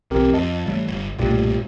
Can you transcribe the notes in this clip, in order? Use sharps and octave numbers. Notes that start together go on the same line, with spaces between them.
B1 E3 C4 G4 A#4
F2 D#5 A5
A2 E3 G3 A3
G1
B1 G2 A#2 G3 A3 G4